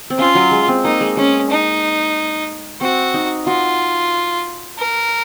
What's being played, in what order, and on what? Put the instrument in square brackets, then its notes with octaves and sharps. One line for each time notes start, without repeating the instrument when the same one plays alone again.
[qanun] C4
[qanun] C#4 [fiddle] F4
[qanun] F#3
G#3
C4
[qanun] A#3 [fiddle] D#4
[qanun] G#3
[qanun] G#3 [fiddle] C#4
[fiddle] D#4
[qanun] C4 [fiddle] F#4
[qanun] D#4
[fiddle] F4 [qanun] F#4
[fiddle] A#4